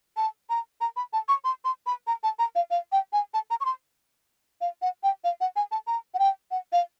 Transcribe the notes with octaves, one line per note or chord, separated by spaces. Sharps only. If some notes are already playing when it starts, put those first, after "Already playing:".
A5
A#5
A#5
B5
A5
C#6
C6
C6
B5
A#5
A5
A#5
F5
F5
G5
G#5
A5
A#5
C#6
C6
F5
F#5
G5
F5
F#5
G#5
A5
A#5
F#5
G5
F#5
F5